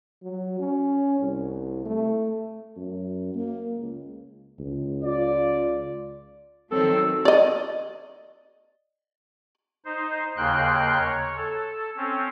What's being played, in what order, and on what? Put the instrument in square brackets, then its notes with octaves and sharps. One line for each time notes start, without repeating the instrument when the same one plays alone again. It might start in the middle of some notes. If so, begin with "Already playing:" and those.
[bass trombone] F#3
C#4
C2
A3
[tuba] F#2
A#3
C#2
C#2
[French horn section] F4 [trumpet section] D5
[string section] D#3 F#3 C4 [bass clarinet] A4
[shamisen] D5 D#5
[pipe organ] D#4 C5
D#2 C#3 A#3 G5 C6 F#6
C#5
A4
C4 C#4